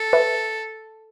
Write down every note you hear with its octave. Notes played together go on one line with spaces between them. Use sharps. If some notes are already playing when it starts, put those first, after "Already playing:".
Already playing: A4
B4 E5